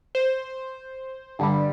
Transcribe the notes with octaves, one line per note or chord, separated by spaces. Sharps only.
C5
G2 D3 G3